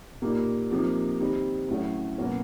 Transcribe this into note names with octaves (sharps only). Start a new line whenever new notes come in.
A#2 G3 A#3 D#4
C3 F3 A#3 D#4
D#3 G3 C4 D#4
A2 F#3 A3 C#4
B2 F#3 A#3 C#4